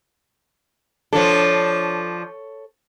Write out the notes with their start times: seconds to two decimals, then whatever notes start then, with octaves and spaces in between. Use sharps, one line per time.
1.13 F3 D4 A4 C#5